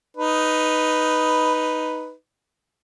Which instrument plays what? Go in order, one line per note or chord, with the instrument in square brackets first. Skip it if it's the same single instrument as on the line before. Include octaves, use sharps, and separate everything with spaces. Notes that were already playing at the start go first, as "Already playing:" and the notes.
[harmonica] D#4 B4